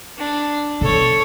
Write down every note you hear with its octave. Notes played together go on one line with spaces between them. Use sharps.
D4
B2 A4 C#5